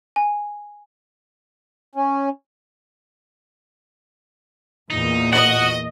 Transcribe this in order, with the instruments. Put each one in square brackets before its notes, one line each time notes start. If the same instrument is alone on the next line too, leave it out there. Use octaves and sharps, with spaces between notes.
[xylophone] G#5
[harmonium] C#4
[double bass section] E2 A#2 [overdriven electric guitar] D#4
[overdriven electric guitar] F#4 [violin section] D#5 [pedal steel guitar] F#5